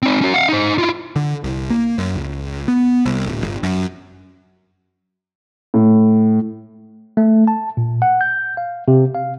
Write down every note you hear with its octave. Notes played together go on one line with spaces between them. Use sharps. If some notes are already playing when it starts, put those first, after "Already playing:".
C4 D#4
C#4 F#4
F5 F#5
D#4 C5
E4 F4
D3
C2
A#3
F#2
C#2
B3
C2
D1
G1
F#2
A2
A3
A5
A#2
F#5
G6
F5
C3
F5